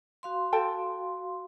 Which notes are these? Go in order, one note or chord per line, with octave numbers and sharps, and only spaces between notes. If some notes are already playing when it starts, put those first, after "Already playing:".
F#4 F5 C6
A4 G5 A5